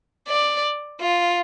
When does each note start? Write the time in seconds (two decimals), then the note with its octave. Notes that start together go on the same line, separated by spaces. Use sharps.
0.28 D5
1.01 F4